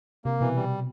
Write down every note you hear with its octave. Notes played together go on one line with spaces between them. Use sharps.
C3 A#3
B2 E3
G3